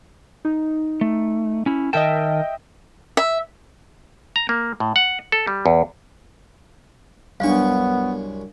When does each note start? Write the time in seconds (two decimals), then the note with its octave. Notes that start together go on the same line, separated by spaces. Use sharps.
0.45 D#4
1.01 A3
1.66 C#4 E4
1.93 D#3 A#4 D#5 E5 G5 A5
3.17 E5
4.36 A#5
4.49 A#3
4.80 A2
4.96 F#5
5.32 A4
5.47 G3
5.66 E2
7.40 C2 F#2 B3 D4 F5 C#6